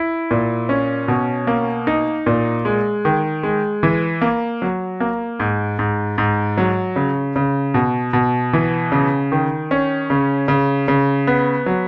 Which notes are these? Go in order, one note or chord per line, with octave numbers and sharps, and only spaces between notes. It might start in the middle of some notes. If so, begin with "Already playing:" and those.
Already playing: E4
A#2
C#4
B2
A#3
D#4
A#2
G#3
D#3
G#3
E3
A#3
F#3
A#3
G#2
G#2
G#2
F#3
C#3
C#3
B2
B2
E3
C#3
D#3
C#4
C#3
C#3
C#3
B3
F#3